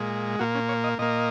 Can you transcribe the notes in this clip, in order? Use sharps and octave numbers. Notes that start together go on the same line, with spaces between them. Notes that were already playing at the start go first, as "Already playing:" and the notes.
Already playing: A#2 G#3
A#2 A#3 F#4
C#4
C#5
D#5
A#2 A#3 D#5